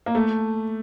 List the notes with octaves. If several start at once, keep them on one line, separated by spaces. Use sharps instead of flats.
A#3
A3